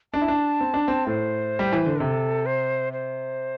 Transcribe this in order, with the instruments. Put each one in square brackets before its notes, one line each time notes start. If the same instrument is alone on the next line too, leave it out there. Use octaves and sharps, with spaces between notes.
[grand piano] D4 [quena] A5
[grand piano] E4
D4
C4
D4
C4
[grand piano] A2 [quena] C5
[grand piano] G3
E3
D3
[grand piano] C3 [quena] A4
[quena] C5
C5